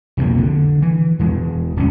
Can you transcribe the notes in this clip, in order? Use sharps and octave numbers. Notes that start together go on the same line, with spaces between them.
B1 F2 B2 A#3
D3
E3
E2 G#3
D1 C2 B3 C#4